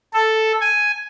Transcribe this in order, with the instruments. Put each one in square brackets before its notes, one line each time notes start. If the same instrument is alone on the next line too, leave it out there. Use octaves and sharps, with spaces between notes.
[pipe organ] A4
G#5